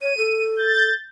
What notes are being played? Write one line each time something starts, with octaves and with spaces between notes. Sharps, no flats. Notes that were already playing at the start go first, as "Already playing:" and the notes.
C#5 D#7
A4
G6 A6